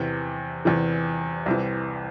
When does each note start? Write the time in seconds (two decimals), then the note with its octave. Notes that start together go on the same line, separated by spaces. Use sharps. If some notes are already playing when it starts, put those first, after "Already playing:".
Already playing: E2 C3 E3
0.65 E2 C3 E3
1.46 C2 C3 E3